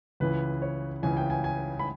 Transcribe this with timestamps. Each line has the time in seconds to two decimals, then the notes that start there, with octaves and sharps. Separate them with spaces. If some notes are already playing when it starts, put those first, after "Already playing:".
0.20 C#2 C#3 E3 B4
0.62 C#5
1.03 C#2 C#3 E3 G#5
1.17 G5
1.30 G#5
1.44 G#5
1.79 B5